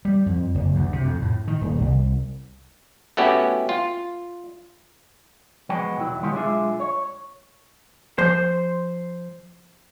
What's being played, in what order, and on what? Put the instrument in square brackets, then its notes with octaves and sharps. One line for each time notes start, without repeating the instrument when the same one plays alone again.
[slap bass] G3
F2
F#1
D2
C3
F2
A2
D#3
D#1
C2
[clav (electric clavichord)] A3 B3 C#4 E4 F#4 G4
F4
[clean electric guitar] F3 G#3 B3 F#4 G5
B1 E2 F#3 E4
D#3 G#3 B3 F4 G4 C#5
B1 G#3 D4 F4 G#4 E5
C#5
[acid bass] F3 [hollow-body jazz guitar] C5